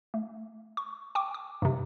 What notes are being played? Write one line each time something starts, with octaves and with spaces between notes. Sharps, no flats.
A3
C#6
G5 C#6 D6
D6
G2 C3